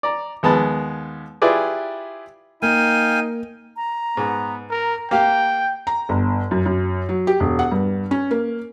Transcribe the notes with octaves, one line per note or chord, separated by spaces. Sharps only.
D5 A#5
D#2 G#3 B3 A5 B5
E4 F4 G4 G#4 B4 D5
A#3 D#4 F5 G5 G#5 D#7
A#5
G#2 B3
A#4 A#5
A#3 G4 F5 G5
A#5
G1
F#2
F#2
F#3
G4
E1
F#5
G2
C#4
A#3